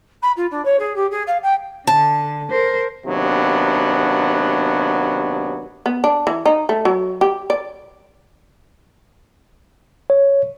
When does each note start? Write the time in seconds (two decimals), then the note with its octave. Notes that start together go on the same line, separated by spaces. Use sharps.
0.22 B5
0.36 F4
0.51 D4
0.65 C#5
0.79 G#4
0.96 G4
1.11 G#4
1.27 F5
1.42 G5
1.87 D3 A5
2.51 A#4 C5
3.06 D#2 C3 F#3 B3 D4
5.86 B3
6.04 D4
6.27 E3
6.46 D#4
6.69 A3
6.85 F#3
7.21 G4
7.50 D5
10.10 C#5